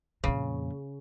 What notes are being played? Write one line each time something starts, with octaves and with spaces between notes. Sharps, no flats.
F2 A#2 C#3